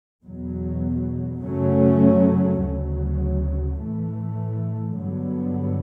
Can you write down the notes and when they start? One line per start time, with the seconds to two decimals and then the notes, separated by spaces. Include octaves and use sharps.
0.25 E2 B2 F#3
1.43 F#2 C#3 F#3 A3 C#4
2.61 D2 C#3 F#3
3.81 A2 E3 A3
4.98 G2 D3 F#3 B3